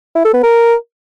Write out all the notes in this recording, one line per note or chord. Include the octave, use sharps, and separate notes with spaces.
E4
A4
B3
A#4